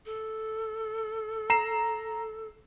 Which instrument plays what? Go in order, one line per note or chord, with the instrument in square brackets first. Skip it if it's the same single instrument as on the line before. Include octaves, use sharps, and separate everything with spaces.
[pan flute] A4
[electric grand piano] A#5 C7 E7